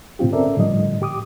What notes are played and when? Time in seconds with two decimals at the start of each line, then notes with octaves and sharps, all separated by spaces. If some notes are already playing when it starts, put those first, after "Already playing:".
0.19 A2 D3 C4 F4 G4
0.32 C4 C#4 A4 A#4 D5 E5
0.57 A2 D3 F3 G3 D#5
1.02 G4 D6 D#6